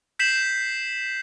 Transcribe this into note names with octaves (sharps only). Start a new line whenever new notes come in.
G6 B6 C7 E7 F#7